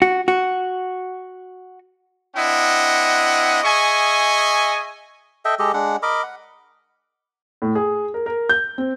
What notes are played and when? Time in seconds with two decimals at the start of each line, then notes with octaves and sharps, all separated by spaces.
0.02 F#4
0.28 F#4
2.35 C4 D4 E4 D#5 F#5
3.63 G#4 D#5 E5 G#5 C#6
5.45 A4 D#5 E5 G5
5.59 G#3 G4 A4 D#5
5.74 G#3 D4 F#5
6.03 A#4 D#5 B5 D6
6.23 F#5
7.62 A2
7.75 G#4
8.14 A#4
8.26 A#4
8.49 G6
8.78 C4